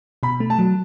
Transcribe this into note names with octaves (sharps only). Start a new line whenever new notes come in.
B2 B5
A3
A5
F#3